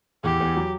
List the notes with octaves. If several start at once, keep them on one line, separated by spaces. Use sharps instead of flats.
E2 E3 G4
E2 E3
F#3